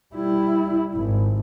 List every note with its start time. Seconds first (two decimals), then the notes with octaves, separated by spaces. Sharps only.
0.15 G3 E4
0.96 G#1